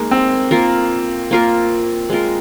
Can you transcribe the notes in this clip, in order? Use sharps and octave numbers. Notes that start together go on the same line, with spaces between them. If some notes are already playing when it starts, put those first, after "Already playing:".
Already playing: G#3 A#3 D#4 A#4
C4
A#3 F4 A#4
A#3 F4 A#4
G#3 F4 A#4